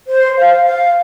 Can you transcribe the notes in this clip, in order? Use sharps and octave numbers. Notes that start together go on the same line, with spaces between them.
C5
F5
F5